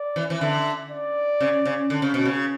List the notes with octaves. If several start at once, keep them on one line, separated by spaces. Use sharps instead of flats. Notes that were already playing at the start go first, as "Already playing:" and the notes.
Already playing: D5
E3
E3
D3 E5
D5
C#3
C#3
D3
C#3
B2
C#3